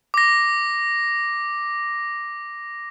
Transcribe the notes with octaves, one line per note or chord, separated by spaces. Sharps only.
D6 A#6